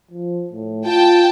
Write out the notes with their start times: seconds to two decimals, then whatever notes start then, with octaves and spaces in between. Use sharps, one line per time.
0.11 F3
0.53 A2
0.85 F4 G5 A5